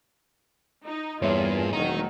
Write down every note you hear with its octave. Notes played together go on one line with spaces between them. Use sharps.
D#4
E2 G2 A#3 F4 G#4 C#5 E5
E1 D#3 F#3 A3 D#4 A#5